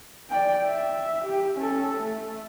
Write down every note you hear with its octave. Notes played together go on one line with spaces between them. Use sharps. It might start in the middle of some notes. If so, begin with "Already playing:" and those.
D5 G5
E5
G4
C#4 A4
A3